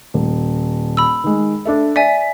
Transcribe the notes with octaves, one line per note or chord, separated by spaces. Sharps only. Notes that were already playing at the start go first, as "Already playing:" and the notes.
D#1
B5 E6
D#3 G#3
D4 A4 E5
D5 E5 G#5 B6